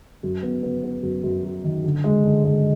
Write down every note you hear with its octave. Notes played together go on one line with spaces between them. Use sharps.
F#2
B3
B3
B3
F#2
F#2
F#3
D#3
D3
G#3
D3
G#3